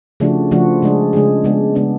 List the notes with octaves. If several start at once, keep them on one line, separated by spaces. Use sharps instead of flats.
C#3 F3 A3 D4 F#4
C#3 F3 A3 D4 F#4
C#3 G#3 D4 G#4
C#3 G#3 D4 G#4
C#3 G#3 B3 D4
C#3 G#3 B3 D4